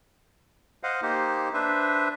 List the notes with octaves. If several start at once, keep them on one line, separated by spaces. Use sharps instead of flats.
C5 D#5 F5 F#5
A#3 D#4 G4 C5
D4 B4 C5 E5